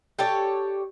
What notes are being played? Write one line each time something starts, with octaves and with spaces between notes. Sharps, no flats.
G4 A4 C#5 D5